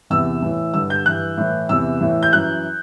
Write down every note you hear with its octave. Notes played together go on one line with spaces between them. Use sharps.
E2 C3 E3 E6
A2 E3
G2 D3 E6
G6
G2 E3 F#6
A2 E3
E2 C3 E3 E6
A2 E3
G6
F#2 E3 F#6